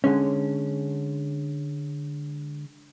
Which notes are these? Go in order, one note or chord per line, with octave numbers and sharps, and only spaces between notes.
D3 G#3 C#4